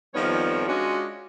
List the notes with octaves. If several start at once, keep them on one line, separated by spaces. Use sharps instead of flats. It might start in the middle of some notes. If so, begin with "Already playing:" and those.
F2 D#3 F3 G3 B3 C#5
G#3 C#4 D4 F4 F#4